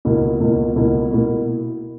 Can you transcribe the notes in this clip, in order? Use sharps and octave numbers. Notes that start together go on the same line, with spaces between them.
C#2 B2 A#3 E4
C#2 B2 A#3 E4
C#2 B2 A#3 E4
B2 A#3 E4